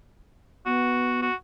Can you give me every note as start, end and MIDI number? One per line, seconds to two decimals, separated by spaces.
0.66 1.29 59
0.66 1.17 66
1.22 1.34 66